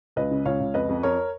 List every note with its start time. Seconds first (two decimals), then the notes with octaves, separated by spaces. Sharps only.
0.16 C#2 B4 D#5
0.31 C#3
0.45 C#2 C#5 F5
0.60 C#2
0.74 F2 B4 D#5
0.89 F2
1.03 F2 A#4 C#5